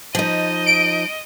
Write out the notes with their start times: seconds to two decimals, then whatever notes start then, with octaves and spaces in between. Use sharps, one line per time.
0.15 F3 D#4 D#5
0.67 D7